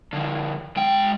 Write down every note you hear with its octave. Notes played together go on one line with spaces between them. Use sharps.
D3 F3
G#3 G5